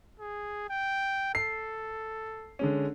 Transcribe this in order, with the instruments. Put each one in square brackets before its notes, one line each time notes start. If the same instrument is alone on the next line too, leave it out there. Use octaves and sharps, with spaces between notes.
[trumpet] G#4
G5
[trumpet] A4 [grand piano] C7
[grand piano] D3 G#3 C#4